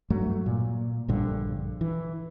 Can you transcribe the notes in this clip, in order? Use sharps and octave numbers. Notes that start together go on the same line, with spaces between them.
G2 F#3 A3
A#2
A#1 G2 D3
E3